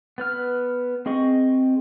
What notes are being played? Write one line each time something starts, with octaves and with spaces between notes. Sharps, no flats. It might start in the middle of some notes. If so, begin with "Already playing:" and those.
B3 B4 F6
C4 G#4 D#5 C#6